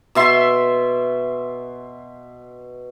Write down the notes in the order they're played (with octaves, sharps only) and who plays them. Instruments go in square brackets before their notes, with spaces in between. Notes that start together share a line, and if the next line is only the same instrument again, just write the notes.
[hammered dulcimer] B2 E5 C6